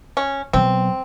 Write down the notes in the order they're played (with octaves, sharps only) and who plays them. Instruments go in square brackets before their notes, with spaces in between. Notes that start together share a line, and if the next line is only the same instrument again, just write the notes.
[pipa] C#4
[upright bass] B2 F#3 [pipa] C4